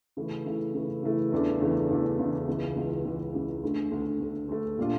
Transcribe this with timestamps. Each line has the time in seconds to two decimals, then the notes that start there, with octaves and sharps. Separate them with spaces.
0.17 C#3 E3 A3 E4
0.46 C#3 E3 A3 E4
0.75 C#3 E3 A3 E4
1.03 C#3 E3 A3 E4
1.32 E2 C#3 E3 A3 D4
1.61 E2 C#3 E3 A3 D4
1.90 E2 C#3 E3 A3 D4
2.18 E2 C#3 E3 A3 D4
2.47 C#2 C#3 E3
2.76 C#2 C#3 E3
3.05 C#2 C#3 E3
3.33 C#2 C#3 E3
3.63 D2 D3 A3
3.91 D2 D3 A3
4.20 D2 D3 A3
4.49 D2 D3 A3
4.78 A#2 G3 D4 F4